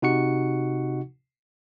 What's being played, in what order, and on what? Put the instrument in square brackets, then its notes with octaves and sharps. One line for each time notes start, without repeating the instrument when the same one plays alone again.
[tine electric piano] C3 D#4 F#4 F#5 C#6 C#7